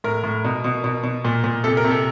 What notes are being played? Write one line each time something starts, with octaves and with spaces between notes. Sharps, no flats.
A2 A#4
A2
B2
B2
B2
B2
A#2
A#2
C3 A4
A#4
C3
A4